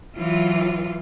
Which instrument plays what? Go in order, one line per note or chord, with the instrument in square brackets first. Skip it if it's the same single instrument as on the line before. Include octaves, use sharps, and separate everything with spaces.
[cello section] E3 F#3 F4